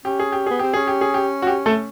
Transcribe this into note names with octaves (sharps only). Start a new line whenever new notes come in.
C#4 G4
G#4
G4
B3 G#4
C4 G4
C#4 G#4
G4
G#4
G4
F#4
G4
A3 A4